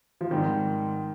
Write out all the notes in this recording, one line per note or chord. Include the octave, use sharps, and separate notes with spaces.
F3
G#2 D#3 G3 C4